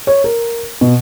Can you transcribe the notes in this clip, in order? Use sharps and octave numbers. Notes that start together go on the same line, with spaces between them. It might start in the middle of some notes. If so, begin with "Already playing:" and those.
C#5
A#4
B2